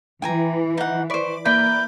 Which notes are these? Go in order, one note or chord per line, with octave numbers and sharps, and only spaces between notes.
E3 G5 G#5 A#5
D#4 F#5
B4 C5 D5 C#6
A#3 E4 A#4 B4 D5 B5 G6